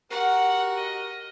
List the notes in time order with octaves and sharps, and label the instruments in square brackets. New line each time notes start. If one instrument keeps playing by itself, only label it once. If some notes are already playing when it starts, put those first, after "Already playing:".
[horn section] F#4 G4 A#4 [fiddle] F#5
[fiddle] D#5